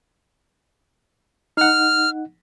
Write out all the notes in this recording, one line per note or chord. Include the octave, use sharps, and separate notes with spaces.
D#4 F#5 F6